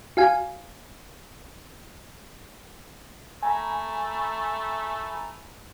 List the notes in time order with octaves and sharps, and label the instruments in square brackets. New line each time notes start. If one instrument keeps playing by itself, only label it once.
[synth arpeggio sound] F#4 F5 G#5
[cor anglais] A3 [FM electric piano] G#5 A#5 B5